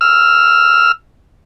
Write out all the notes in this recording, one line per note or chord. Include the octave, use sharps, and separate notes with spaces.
E6 F6